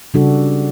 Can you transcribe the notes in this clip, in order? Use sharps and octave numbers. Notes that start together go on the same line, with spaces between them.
C#3 G3 D4 F#4 A4